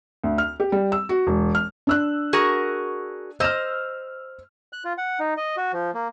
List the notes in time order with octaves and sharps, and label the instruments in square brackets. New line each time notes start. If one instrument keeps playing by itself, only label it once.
[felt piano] D2
F6
G4
G3
E6
F#4
E1
F6
D4 E6 F#6
[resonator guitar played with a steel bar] F#4 G#4 A#4
[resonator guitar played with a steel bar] C5 D#5 [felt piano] E6 F6
[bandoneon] F#6
F4
F#5
D#4
D#5
F#4
F3
A#3